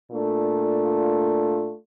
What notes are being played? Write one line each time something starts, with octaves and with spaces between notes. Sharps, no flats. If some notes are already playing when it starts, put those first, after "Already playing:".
A#2 A3 D4 F4